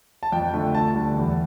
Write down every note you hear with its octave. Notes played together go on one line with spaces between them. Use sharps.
A5
F2 G5
D3 A3
D2 A5
D3 G3
E2